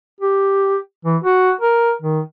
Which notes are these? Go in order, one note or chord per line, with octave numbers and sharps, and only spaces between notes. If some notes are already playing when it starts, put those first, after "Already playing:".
G4
E3
F#4
A#4
D#3